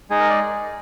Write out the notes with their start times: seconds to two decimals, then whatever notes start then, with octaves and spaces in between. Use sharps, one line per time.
0.10 G#3 D#4 G#4
0.20 A#4
0.30 D5